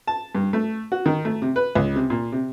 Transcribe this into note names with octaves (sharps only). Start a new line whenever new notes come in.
A5
G2
A3
F#4
D#3
A3
C3
B4
C#2
C3
A#2
C3